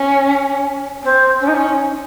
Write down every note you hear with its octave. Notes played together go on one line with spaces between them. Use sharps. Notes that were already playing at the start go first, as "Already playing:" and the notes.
Already playing: C#4
C4
C#4
D#4
C#4